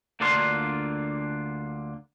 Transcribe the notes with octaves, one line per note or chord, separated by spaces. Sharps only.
D2 D3 A#3 D4 F4 C6